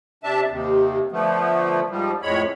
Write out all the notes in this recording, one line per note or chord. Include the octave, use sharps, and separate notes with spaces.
C3 D4 E5 A5
D#2 C3
D3 F3 A3 B3
G#2 F3 G3
F2 A2 G#3 C#5 B5